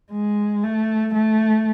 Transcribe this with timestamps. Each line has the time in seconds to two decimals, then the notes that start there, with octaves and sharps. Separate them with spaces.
0.12 G#3
0.64 A3
1.14 A3